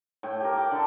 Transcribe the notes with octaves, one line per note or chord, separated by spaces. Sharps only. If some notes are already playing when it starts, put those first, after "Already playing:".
A2 G5
G4 A#4
D6
D3 A4